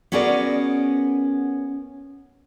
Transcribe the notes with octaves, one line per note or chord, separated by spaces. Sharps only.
B3 C#4 F#4 G#4 A#4 D5